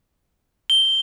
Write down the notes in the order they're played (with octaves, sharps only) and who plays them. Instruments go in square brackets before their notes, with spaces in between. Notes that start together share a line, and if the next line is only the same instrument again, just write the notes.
[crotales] G7